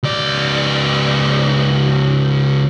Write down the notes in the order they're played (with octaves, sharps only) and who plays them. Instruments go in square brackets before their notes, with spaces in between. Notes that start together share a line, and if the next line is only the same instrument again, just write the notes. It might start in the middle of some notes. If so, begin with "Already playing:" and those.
[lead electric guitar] C#2 D5